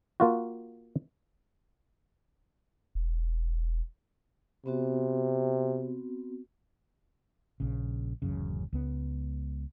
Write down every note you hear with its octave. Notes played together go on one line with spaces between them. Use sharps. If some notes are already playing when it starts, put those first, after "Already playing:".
A#3 F4 F#4
E1
C3 B3 C4 F#4
A#1 C#3
D1 A1 F#2 C#3
C#2 B3